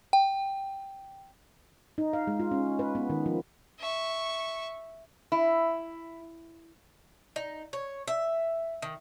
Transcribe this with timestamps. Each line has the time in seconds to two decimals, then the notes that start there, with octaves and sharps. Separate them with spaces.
0.13 G5
1.98 D#4
2.13 F5
2.27 G#3
2.40 F4
2.51 C#4
2.79 B4
2.95 B3
3.10 D#3
3.26 F3
3.79 E5 C#6
5.32 E4
7.36 D#4
7.73 C#5
8.08 E5
8.82 D#3